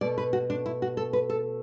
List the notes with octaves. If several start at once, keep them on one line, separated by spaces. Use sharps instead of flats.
B2 A3 D5
B4
F#4
D4
E4
F#4
A4
B4
A4